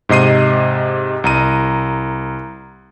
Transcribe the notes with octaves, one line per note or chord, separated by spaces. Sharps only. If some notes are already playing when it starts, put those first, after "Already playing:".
G#2 C3 D#5 C7 D#7
C2 A#5 D#7